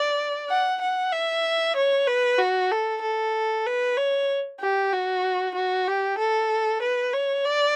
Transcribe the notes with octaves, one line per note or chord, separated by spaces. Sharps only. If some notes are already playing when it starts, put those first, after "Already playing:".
Already playing: D5
F#5
F#5
E5
C#5
B4
F#4
A4
A4
B4
C#5
G4
F#4
F#4
G4
A4
B4
C#5
D5